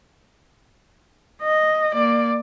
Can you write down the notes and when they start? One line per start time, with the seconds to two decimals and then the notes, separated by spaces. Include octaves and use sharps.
1.42 D#5
1.93 A#3 D5